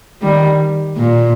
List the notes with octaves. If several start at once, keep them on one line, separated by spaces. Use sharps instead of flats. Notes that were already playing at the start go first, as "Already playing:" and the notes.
D#3 G3
A#2